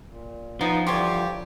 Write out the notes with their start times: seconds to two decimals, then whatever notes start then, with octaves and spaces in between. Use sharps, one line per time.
0.10 A#2
0.61 F3 B3 D#4
0.87 D3 E3 G3 F4 G4 C#5